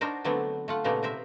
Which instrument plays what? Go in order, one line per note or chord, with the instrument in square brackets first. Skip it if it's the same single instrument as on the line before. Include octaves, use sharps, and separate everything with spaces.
[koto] D4 D#4 F#4 A#4 C5
D3 F#3 A3 B3 C4 D4
A3 F4 F#5
A#2 C#3 A3 B3 D#4 G4
C3 A#4 C5 E5